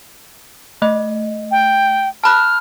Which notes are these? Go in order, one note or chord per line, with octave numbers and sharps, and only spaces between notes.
A3 D#5
G5
A5 B5 F6 F#6